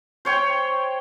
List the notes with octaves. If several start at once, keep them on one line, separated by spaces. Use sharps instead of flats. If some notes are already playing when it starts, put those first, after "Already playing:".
C5 C#5 G5